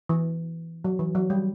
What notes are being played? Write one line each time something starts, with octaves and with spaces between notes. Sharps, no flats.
E3
F#3
E3
F#3
G3